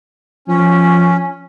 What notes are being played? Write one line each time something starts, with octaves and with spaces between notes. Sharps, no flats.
F3 C#4